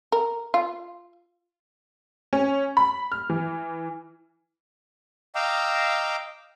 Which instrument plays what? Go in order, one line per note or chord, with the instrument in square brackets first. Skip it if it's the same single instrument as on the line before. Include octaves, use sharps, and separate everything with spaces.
[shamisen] A#4
F4
[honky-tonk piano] C#4
B5
F6
E3
[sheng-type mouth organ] D#5 F5 G5 A#5 D6 E6